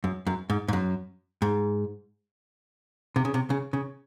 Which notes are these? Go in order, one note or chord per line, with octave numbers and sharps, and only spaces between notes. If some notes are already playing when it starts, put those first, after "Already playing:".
F#2
F#2
G#2
G#2
F#2
G#2
C3
C#3
C3
C#3
C#3